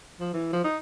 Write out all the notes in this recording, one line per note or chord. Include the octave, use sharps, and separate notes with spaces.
F3
E3
F3
D#4